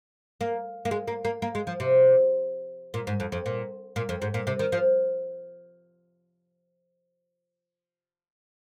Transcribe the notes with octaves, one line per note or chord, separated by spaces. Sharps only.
A#3
A#3
G#3
A#3
A#3
A#3
G#3
F3
C3
A#2
G#2
F2
F2
A#2
A#2
F2
G#2
A#2
C3
D#3
F3